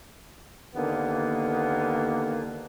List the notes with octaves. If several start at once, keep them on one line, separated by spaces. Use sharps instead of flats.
D#2 D3 A#3 B3